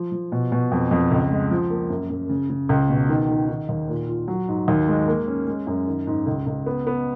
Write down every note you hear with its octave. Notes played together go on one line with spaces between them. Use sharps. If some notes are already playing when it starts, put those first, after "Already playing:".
Already playing: F3
F3
B2
B2
F2
F2
C#2
G#3
F3
A#3
F#2
F#2
C#3
C#3
C#2
B2
D#3
D#3
D#3
D#2
A#2
F4
F#3
G#2
D#2
G#3
A#3
C#4
G#3
F#2
D#3
G#2
C#2
C#2
B3
B3